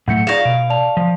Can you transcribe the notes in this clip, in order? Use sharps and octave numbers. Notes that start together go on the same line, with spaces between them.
A2 F#3 A3 F#5 G6 C#7
D#4 F4 G#4 D5 F5 C#6 A#6 E7
B2 D7
D5 A5 F7
F3